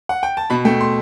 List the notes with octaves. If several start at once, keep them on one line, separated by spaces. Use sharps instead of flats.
F#5
G5
A5
B2 B5
A3 G5
C6